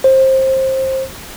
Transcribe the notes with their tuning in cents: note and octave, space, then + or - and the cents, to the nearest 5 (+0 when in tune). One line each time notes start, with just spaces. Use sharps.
C5 +20